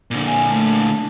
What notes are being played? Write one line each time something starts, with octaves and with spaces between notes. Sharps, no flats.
A#2 D3
G#5
A3